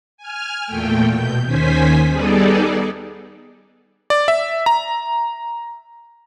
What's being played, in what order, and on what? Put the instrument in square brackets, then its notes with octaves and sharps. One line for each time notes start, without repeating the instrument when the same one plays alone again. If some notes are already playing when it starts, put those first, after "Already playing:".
[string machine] G#5 F6
E2 A#2 A3 G5
B2 G6
D#2 D#3 C#4 C5 G#5 B6
G3 B3 D#4 G#4 A4 D5
[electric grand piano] D5
E5
A#5